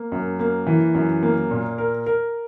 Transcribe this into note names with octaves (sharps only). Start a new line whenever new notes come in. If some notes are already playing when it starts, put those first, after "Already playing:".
Already playing: A#3
F#2
A#3
E3
F#2
A#3
A#2
A#4
A#4